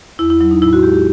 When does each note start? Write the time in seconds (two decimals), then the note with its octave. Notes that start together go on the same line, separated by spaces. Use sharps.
0.19 E2 E4
0.30 E4
0.40 F#3 E4
0.51 D#4
0.62 A2 E4
0.73 F#4
0.83 G#3 G4
0.94 G4